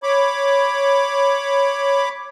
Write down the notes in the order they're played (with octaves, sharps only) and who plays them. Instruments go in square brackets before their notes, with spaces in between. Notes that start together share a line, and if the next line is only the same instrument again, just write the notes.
[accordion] C#5 B5 D6